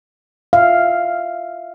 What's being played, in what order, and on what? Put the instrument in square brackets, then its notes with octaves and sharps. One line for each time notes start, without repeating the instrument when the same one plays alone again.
[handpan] E5 F5